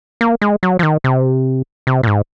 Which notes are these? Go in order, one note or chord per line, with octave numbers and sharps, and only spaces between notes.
A#3
G#3
F#3
F3
D#3
C3
C3
A#2
G#2